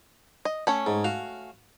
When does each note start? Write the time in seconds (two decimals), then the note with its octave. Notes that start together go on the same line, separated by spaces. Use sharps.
0.45 D#5
0.67 A3 C#4 C#5
0.86 G#2
1.04 F#4 F5